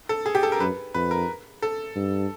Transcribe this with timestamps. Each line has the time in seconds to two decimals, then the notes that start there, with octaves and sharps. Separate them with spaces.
0.09 A4
0.26 G#4
0.35 G4
0.43 A4
0.52 A#4
0.60 F#2 B4
0.94 F2 B4
1.11 A#4
1.62 A4
1.96 G2